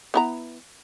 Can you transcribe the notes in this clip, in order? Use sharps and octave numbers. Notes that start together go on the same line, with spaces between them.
B3 E4 A#5